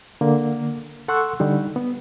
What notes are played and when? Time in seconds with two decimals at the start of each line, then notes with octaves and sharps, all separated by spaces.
0.21 D3 A#3
1.08 A4 F#5 C6 C#6 E6 F#6
1.40 D3 G3 D#4
1.76 B3